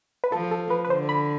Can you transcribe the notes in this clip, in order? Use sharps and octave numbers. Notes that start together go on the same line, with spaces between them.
B4
F3 A4
A4
B4
B4
D3 C5
B5